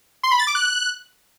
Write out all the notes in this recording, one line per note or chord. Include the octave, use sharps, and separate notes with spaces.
C6
B5
A6
D6
F#6